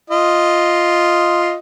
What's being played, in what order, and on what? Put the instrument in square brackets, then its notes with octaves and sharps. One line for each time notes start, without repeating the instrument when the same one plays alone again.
[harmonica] F4 D#5